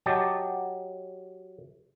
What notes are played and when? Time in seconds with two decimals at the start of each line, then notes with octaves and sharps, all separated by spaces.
0.06 F#3 G4 D#5 A5